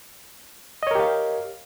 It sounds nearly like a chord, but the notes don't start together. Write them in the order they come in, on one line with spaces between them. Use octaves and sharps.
D#5 C#5 A#4 G4 F5